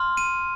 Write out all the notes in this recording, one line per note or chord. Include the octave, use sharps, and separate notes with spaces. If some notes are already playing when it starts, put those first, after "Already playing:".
Already playing: C6 F6
D#7